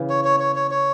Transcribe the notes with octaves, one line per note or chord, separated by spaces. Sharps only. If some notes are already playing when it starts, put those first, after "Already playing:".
Already playing: C#3 E3
C#5
C#5
C#5
C#5
C#5